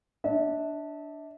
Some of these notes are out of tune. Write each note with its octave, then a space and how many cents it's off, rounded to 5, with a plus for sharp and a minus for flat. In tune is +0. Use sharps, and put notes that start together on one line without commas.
D4 +0 E5 -35